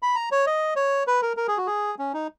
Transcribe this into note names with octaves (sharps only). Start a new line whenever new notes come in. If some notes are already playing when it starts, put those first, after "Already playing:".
B5
A#5
C#5
D#5
C#5
B4
A#4
A#4
G#4
F#4
G#4
C#4
D#4